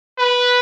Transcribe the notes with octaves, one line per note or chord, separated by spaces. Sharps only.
B4